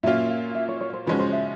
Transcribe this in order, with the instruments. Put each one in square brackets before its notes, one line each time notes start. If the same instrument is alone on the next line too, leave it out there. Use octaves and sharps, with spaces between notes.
[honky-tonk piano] A#2 F#3 A#3 C#4 F4 [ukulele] E5
[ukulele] F5
E5
C#5
C#5
C5
[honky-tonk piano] C#3 F3 G#3 C#4 F#4 [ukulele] B4
[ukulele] C5
E5